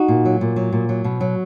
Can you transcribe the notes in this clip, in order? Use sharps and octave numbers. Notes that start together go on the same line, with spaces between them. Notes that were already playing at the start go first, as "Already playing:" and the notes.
Already playing: D#4 F#4
A#2
F#3
A#2
F#3
A#2
F#3
B2
F#3